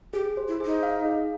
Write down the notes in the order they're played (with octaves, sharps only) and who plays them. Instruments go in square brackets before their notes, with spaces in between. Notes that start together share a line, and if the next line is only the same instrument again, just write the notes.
[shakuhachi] G4 [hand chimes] G#4
[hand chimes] C5
[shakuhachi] E4
[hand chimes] G#4
[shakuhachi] D#4
[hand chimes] F5
G#4